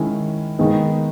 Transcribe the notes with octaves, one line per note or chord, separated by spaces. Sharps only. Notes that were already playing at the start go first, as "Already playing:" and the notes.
Already playing: D#3 G#3 C#4 E4
D#3 G#3 B3 D#4